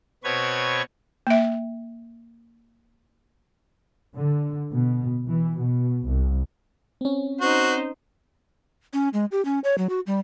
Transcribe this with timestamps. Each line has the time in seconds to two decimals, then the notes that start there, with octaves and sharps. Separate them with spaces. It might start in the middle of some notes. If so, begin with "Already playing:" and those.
0.24 B2 C4 B4 C#5 G#6
1.27 A#3 E5
4.15 D3
4.71 B2
5.28 E3
5.58 B2
6.06 C2
7.01 C4 C#4
7.41 D#4 F#4 C5
8.93 C#4
9.14 G#3
9.32 G4
9.45 C#4
9.64 C#5
9.78 F#3
9.89 F#4
10.07 G3